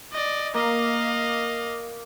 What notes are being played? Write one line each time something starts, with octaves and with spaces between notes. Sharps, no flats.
D5 D#5
A#3 D#5 F5